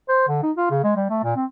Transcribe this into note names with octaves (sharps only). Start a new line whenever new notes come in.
C5
D3
D#4
F4
C#3
G#3
G3
A3
A#2
C4